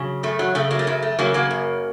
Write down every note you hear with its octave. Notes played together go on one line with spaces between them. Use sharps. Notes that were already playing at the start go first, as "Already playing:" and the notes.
Already playing: C#3 F#3
F#2 A3
F#3
C#3 A3
F#3 A#3
A3
F#2 F#3
A3
C#3 F#3 A#3
F#3 A#3
F#2